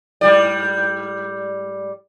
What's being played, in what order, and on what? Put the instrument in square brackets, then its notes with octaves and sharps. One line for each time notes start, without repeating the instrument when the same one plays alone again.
[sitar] G#2 G3 D5